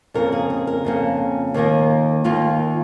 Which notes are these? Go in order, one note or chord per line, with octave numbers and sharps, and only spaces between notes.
F2 C#3 A#3 A#4
G#4
G#4
A#4
F2 C#3 A#3
D#2 D#3 A#3 A#4
D#2 D#3 A#3 F4